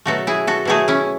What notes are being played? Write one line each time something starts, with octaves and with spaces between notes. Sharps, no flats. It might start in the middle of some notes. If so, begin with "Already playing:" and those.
B2 F#3 A3 F#4 A4
E4 G#4
F#4 A4
B2 F#3 A3 E4 G#4
C#4 E4